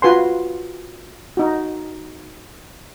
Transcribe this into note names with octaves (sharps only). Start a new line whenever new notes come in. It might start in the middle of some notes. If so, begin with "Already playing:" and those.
F4 F#4 B4 G#5 C6
D#4 F#4